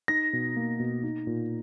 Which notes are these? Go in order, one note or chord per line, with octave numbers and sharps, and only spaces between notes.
D#4 A#6
B2
A#3
B2
D#4
A#2